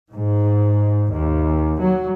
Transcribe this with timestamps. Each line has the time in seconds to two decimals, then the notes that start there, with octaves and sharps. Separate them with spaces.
0.12 G#2
1.13 D#2
1.81 F#3